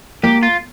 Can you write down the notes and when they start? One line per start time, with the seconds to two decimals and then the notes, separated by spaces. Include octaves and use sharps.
0.23 A#3 G4
0.43 F4